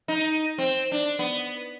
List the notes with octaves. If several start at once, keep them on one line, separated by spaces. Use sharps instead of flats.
D#4
C4
D4
B3